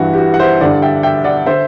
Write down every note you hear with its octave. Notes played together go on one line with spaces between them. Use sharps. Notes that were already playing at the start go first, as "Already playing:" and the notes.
Already playing: G2 E3 F#4
G4
F#4
F#5
C5 E5
G2 D3 D5 F#5
E5 G5
E5 G5
D5 F#5
D3 C5 E5